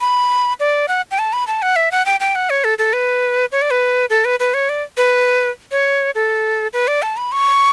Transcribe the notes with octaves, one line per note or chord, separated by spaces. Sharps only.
B5
D5
F#5
G5
A5
B5
A5
F#5
E5
F#5
G5
G5
F#5
C#5
A4
A4
B4
C#5
D5
B4
A4
B4
B4
C#5
D5
B4
C#5
A4
B4
D5
A5
B5
C#6